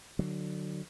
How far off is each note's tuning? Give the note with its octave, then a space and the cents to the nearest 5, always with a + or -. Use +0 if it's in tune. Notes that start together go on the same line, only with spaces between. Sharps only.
D3 +25 F#3 +0